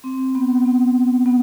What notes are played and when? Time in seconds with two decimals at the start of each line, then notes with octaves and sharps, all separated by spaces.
0.04 C4
0.35 B3
0.65 B3
1.26 B3